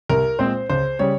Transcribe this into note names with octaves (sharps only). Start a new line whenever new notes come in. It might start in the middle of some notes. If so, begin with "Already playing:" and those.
C2 A#4
A#2 G#3 C4 C5
C#2 C5
C#3 G3 C#5